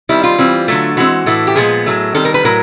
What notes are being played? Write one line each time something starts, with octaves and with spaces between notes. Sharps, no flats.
D#3 G3 C4 E4
F4
E3 G3 C4
D3 F#3 A3
E3 G#3 C4 F#4
A2 E3 A3
G4
A#2 F3 G#3 B3 G#4
A2 F#3 A3
D#3 G3 C4 A4
A#4
B4
A2 F#3 A#4